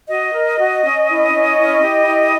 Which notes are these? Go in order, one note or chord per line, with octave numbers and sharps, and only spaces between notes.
F#4 D#5
A#4
F#4
C#4
E4
C#4
E4
G4
E4